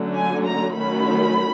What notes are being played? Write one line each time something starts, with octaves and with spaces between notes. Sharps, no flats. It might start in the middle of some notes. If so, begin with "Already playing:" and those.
Already playing: D3 F#3 A3 C#4
G#5
A#5
D#3 F#3 A3 C#4 B5